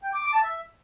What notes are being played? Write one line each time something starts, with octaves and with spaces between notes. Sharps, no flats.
G5
D6
D6
A5
E5